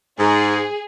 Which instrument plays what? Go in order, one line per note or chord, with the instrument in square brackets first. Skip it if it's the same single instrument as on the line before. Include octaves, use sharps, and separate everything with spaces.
[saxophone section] G#2 [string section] G#4